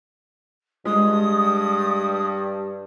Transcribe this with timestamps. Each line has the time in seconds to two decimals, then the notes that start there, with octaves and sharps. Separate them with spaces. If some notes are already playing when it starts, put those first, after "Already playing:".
0.85 G2 G#3 D#6